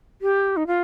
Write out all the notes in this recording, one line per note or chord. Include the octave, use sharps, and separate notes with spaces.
G4
D#4
F4